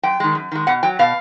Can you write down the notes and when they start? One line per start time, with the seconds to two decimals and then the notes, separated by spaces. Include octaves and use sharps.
0.03 F#2 G5
0.20 D#3 G#3
0.35 F#2
0.52 D#3 G#3
0.67 B2 F#5
0.83 F#3 G5
0.99 B2 F5